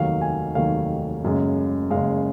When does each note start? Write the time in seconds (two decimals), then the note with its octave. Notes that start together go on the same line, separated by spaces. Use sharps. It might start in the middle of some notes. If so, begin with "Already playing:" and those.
Already playing: F1 D#2 D#3 F#3 F5
0.21 G#5
0.55 F1 D#2 D#3 F#3 F5
1.23 F#1 F#2 C#3 G#3
1.90 F#1 F#2 C#3 G#3 F5